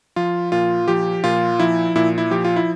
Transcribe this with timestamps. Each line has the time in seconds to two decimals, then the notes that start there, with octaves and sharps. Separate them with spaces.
0.16 F3 F4
0.52 A#2 F4
0.88 F3 G4
1.24 A#2 F4
1.60 F3 E4
1.96 A#2 E4
2.18 E4
2.31 F3 G4
2.45 F4
2.56 E4